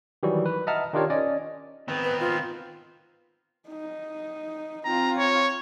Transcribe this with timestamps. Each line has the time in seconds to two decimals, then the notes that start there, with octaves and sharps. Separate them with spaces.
0.23 D#3 E3 F#3 G3 F#4
0.46 B4
0.67 D#5 E5 F#5 A5 A#5 F6
0.93 D#3 D4 F4 G4 A#4 C#5
1.10 C#4 D5 D#5
1.88 D#3 B3 C4 B5
2.04 B4
2.20 F4
3.69 D#4
4.85 C4 F4 A#5
5.17 C#5